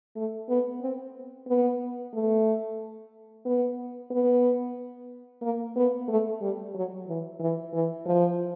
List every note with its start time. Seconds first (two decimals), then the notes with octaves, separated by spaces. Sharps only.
0.16 A3
0.49 B3
0.81 C4
1.47 B3
2.13 A3
3.45 B3
4.11 B3
5.42 A#3
5.76 B3
6.08 A3
6.41 G3
6.75 F#3
7.07 E3
7.40 E3
7.73 E3
8.06 F3